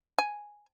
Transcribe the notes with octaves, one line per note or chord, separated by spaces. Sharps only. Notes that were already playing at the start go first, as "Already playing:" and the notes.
G#5